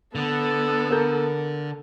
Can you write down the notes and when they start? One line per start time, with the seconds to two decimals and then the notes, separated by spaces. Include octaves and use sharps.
0.15 D3 B3 A4
0.91 A#3 A#4 G6